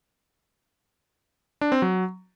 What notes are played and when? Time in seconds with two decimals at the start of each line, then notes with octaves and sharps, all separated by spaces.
1.61 D4
1.72 C4
1.82 F#3